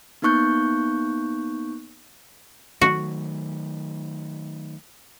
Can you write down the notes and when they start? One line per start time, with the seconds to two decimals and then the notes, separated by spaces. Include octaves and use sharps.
0.22 A#3 B3 D#4 C#6 F#6 G6
2.81 D#3 F#3 A3 F#4